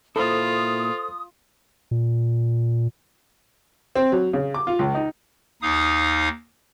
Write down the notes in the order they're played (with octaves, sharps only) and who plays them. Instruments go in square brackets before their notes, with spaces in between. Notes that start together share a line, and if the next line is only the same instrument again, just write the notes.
[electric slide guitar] A#2 E4 [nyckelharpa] F4 [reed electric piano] A4 C5 [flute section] D#6
[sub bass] A#2
[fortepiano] C4
F#3
C#3
D6
F4
C#2
D#4
[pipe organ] D#2 D#4 F5 D#6